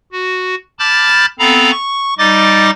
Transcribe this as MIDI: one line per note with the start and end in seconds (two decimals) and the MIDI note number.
0.12 0.55 66
0.79 1.26 81
0.79 1.26 83
0.79 1.26 86
0.79 1.26 89
0.79 1.26 91
0.79 1.26 93
1.39 1.71 59
1.39 1.71 60
1.39 1.71 69
1.39 1.71 77
1.39 1.71 82
1.39 1.71 83
1.71 2.14 85
2.18 2.71 55
2.18 2.71 63
2.18 2.71 75
2.18 2.71 86
2.18 2.71 93